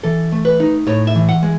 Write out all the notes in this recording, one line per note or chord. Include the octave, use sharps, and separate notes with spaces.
E3 A4
A3
B4
D#4
A2 C#5
E5
E3
F#5
G#3